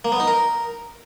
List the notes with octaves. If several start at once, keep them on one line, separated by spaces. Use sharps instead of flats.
A#3
B3
D#4
A#4